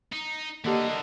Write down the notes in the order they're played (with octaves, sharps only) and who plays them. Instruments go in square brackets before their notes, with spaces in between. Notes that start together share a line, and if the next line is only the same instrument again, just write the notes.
[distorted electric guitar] D#4
[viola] D3 D#5 [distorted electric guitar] E3 A#4 [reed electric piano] A#3 G4